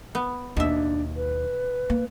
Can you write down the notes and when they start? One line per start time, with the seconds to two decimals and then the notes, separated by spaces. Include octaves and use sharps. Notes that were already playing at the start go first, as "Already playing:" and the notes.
0.15 B3
0.57 D#2 B2 D4 E5
1.16 B4
1.90 A#3